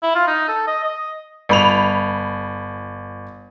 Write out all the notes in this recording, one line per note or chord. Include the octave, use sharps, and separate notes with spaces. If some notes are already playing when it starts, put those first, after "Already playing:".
E4
F4
D#4
A4
D#5
D#5
G1 B5 F7